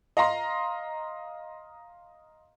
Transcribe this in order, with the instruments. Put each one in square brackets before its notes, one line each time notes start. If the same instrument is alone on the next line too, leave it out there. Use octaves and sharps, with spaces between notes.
[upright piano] D#5 F5 A#5 C6